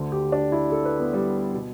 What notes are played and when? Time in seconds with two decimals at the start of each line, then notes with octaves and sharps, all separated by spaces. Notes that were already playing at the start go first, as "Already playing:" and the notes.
Already playing: D2 D3
0.12 G4
0.32 D4
0.52 E4
0.72 A4
0.85 B4
1.00 B3
1.13 G3
1.54 B2